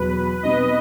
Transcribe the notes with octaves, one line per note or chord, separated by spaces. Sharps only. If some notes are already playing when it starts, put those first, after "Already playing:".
Already playing: E2 B2 F#3 B3 B4
B2 G3 C4 D#4 D#5